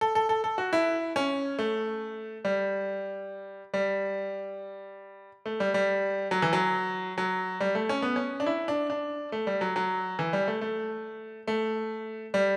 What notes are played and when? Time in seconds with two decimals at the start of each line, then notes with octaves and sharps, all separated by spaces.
0.01 A4
0.15 A4
0.29 A4
0.44 A4
0.58 F#4
0.73 E4
1.16 C#4
1.59 A3
2.45 G3
3.74 G3
5.46 A3
5.60 G3
5.74 G3
6.31 F#3
6.42 E3
6.53 F#3
7.18 F#3
7.61 G3
7.75 A3
7.89 C#4
8.02 B3
8.16 C#4
8.40 D4
8.46 E4
8.68 D4
8.90 D4
9.32 A3
9.47 G3
9.61 F#3
9.76 F#3
10.19 E3
10.33 G3
10.48 A3
10.61 A3
11.47 A3
12.34 G3